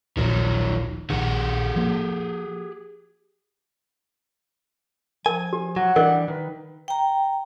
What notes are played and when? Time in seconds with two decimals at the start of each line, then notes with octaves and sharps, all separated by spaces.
0.17 D#1 A#1 D#3 F#3
1.10 A#1 D#3 G4 G#4 F#5
1.76 F3 A#3
5.26 F3 A#4 G#5
5.53 G4
5.76 F#3 F#5
5.96 E3 G3 D4 A#4 D#5
6.28 D#3 B4
6.88 G5 A#5